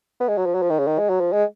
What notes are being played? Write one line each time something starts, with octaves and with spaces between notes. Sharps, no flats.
B3
G#3
F#3
F3
F#3
F3
D#3
C#3
D#3
G#3
F#3
F3
G#3